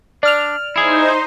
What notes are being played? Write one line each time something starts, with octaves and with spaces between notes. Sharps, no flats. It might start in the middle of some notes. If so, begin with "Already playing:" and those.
D4 D5 F6 F7
D#4 E4 G#4 C5